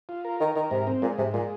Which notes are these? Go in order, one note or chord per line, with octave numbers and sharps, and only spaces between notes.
F4
A#4
D#3 A#4
D#3 A#4
G#2 C3
C4
A#2 G#3
G#2 C3
A#2 G#3